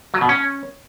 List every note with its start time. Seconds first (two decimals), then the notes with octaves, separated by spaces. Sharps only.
0.14 F#3
0.21 B2
0.29 C#4